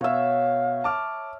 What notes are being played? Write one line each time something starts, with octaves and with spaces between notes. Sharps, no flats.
B2 C#5 E5 F5
A5 D6 F6